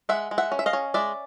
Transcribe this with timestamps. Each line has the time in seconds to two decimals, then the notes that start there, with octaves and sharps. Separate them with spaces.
0.09 G#3 E5 F#5
0.31 G#3
0.38 E5 F#5
0.52 C#4
0.59 E5
0.66 D#5 F5
0.73 C#4
0.94 G#3 D5 E5